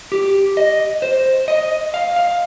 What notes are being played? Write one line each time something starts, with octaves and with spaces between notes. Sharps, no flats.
G4
D#5
C5
D#5
F5
F5